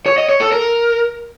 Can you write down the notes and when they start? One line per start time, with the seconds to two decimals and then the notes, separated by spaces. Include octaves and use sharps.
0.06 C#5
0.18 D#5
0.29 C#5
0.41 A4
0.52 A#4